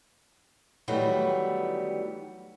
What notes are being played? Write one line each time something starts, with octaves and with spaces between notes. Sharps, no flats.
D#3 E3 F#3 G3 A3 B3